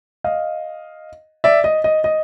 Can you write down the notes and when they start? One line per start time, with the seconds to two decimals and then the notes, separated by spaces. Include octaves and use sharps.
0.24 D#5 F5
1.44 D5 E5
1.64 D#5
1.84 D#5
2.04 D#5